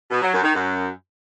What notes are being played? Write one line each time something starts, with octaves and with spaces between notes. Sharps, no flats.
B2
F#3
F#2
D#3
F#2